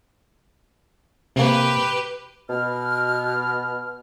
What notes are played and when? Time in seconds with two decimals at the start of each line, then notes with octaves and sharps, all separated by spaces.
1.36 C3 A#3 G4 B4
2.50 B2 F6